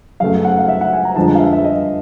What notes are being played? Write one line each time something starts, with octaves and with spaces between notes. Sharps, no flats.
F#2 C#3 F#3 A3 F5
F#5
F5
E5
F#5
G#5
A#5
F2 D3 F3 G#3 A5
F5
E5
E5
D#5